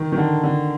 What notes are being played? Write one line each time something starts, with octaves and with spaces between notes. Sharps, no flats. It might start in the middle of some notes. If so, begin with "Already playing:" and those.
Already playing: D#3
D#3
D3
D3